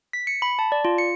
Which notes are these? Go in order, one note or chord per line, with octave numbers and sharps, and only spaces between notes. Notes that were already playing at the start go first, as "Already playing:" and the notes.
B6
C#7
B5
A5
D5
F4
C#7